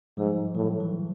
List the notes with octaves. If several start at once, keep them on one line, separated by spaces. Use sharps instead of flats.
G#2 F3 G3
A2 E3 F#3
E3
D#3